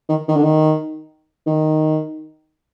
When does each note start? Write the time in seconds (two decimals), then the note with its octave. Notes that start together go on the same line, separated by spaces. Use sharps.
0.09 D#3
0.28 D#3
0.36 D3
0.43 D#3
1.46 D#3